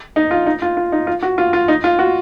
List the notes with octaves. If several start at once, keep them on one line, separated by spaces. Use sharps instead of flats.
D#4
F4
D#4
F4
F4
D#4
F4
F#4
F4
F4
D#4
F4
F#4